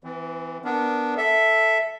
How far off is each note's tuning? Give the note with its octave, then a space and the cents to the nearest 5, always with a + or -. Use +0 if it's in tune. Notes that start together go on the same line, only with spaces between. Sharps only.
E3 +0 C4 -45
B3 +0 D4 +0 A#4 +0
A4 +0 E5 +0